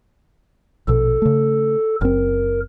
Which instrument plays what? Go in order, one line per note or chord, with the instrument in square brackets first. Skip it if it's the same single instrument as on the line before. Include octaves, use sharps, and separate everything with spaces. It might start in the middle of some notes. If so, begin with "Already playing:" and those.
[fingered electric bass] A#1 B2 [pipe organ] A4
[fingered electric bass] C#3 A3
[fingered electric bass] F#1 C4 [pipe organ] A#4